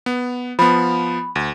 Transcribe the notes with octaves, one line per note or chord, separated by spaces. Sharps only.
B3
F3 B3 B5
D2